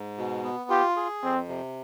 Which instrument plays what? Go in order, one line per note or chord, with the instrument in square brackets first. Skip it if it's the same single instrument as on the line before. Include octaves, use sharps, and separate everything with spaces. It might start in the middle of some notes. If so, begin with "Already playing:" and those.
Already playing: [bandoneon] G#2
B2
B3
[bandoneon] F4 [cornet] G4
[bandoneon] G#4
[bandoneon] F2 [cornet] C4
[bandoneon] C3